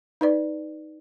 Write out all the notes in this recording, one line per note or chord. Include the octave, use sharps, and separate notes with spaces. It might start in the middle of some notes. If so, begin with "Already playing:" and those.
D#4 B4 D5